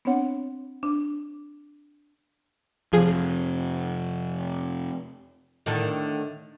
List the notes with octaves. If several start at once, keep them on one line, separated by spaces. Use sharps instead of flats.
B3 C4 D4 C#5 F#5
D4
F2 C3 F3 G#4
A2 D3 D#3